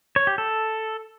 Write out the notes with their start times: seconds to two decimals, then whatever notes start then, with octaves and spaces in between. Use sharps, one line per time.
0.16 C#5
0.27 G4
0.38 A4